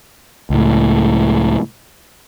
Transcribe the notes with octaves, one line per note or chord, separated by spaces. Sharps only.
C#2 A2